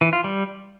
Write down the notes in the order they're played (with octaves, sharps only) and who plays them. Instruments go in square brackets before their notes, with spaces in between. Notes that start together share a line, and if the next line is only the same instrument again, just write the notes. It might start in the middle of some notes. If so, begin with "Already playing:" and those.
[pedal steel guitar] E3
F4
G3